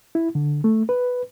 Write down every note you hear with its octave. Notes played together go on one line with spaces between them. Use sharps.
E4
D3
A3
B4